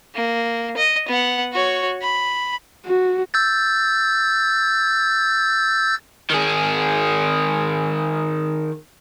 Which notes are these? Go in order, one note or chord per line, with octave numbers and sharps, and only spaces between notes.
A#3
D#5
B3 F#5
F#4 C#5
B5
F#4
E6 G6 A6
D#3 G#4